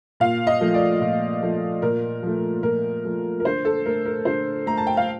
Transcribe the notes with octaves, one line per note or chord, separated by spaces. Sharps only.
A#2 F5
D#5
F3 A3
D5
A#2
F3 A3
A#2 A#4
F3 A3
A#2 A#4
F3 A3
A#4
D3 C5
A4
A3 A#4
A#4
D3 C5
A3 A#5
A5
G5
F5